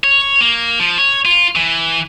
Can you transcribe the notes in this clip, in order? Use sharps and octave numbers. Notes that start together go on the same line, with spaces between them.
C#5
A#3
F3
C#5
F4
E3